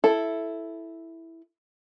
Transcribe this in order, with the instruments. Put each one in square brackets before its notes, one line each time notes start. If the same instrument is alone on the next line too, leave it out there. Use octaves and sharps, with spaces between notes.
[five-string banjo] E4 A4